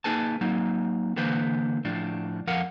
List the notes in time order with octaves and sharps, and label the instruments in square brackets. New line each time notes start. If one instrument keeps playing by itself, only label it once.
[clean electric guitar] A#3 D#4 G#4 B4 G#5 A5
F#3 A#3 D#4
D3 E3 A#3 B4 C5
A2 F3 D4
F2 F3 A#4 F5 F#5